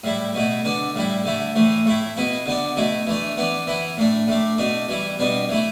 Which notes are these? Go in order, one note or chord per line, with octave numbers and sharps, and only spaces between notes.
A2 G3 E4
B2 A3 E4
D3 B3 D4
A2 G3 E4
D3 A3 E4
A2 E3 A3
A2 A3 E4
B2 B3 E4
D3 B3 D4
B2 A3 E4
E3 A3 D4
E3 B3 D4
E3 B3 E4
A2 A3 D4
A2 A3 D4
B2 A3 D4
E3 G3 E4
B2 G3 B3 D4
E3 A3 E4